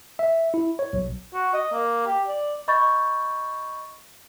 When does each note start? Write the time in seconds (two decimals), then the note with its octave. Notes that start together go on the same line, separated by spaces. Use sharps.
0.19 E5
0.54 E4
0.79 C#5
0.93 B1
1.34 F#4
1.54 D#5
1.72 A#3
2.07 G4
2.28 D5
2.68 D#5 B5 C#6 G6 A6